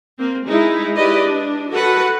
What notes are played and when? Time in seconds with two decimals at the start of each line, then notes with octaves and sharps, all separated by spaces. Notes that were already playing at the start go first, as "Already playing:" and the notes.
0.19 A#3 C4
0.48 G#3 D#4 E4
0.95 E4 G4 B4 D5 D#5
1.26 D4
1.72 F#4 A4 B4 F#5